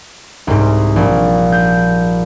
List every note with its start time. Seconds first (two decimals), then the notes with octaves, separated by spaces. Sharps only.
0.47 C2 G#2
0.96 A#1
1.52 G6